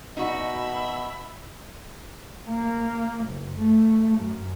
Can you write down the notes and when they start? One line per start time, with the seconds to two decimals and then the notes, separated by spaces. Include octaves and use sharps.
0.17 B2 D#4 F#4 E5 B5
2.49 A#3
3.25 F#1
3.58 A3
4.18 F#2